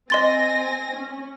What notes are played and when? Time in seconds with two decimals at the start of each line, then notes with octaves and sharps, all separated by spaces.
0.10 C4 D#5 G#5 C6 A6 A#6
0.96 C#4